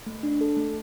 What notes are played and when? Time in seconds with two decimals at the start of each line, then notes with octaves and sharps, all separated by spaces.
0.06 A3
0.23 D4
0.41 A4
0.57 A3